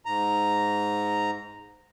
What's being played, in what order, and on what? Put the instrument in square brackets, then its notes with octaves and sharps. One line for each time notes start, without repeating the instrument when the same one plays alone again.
[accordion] G#2 A#5